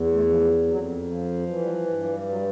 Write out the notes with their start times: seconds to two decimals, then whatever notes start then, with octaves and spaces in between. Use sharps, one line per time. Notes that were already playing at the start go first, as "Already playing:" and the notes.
Already playing: E2
0.13 A3
0.27 F3
0.41 F3
0.67 F2 F#3
1.07 F3
1.48 E3 F#3
1.60 G3
1.69 F#3
1.88 G2 G3
2.03 F#3
2.09 G3
2.29 F#3
2.36 G3